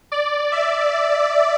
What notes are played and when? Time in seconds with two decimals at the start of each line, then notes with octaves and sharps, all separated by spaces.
0.12 D5
0.52 E5